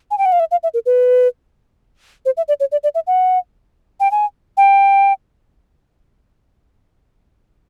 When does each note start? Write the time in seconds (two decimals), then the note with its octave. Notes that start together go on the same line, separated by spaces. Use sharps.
0.11 G#5
0.18 G5
0.26 F#5
0.32 F5
0.40 E5
0.51 F5
0.63 E5
0.74 A#4
0.86 B4
2.26 C5
2.37 E5
2.48 D5
2.60 C#5
2.72 D5
2.83 D5
2.95 E5
3.07 F#5
4.00 G5
4.11 G#5
4.57 G5